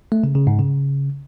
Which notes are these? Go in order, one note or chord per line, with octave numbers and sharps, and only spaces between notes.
A3
C#3
C#3
G#2
C#3